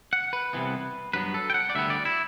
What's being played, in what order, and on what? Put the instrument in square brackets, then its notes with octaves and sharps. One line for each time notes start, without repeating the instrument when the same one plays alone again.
[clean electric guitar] F#5
B4
C2 C3 E3 B3
G2 F#3 B3 B4
A4
G5
F#5
D5
D2 D3 G3 B3 E5
D5
E4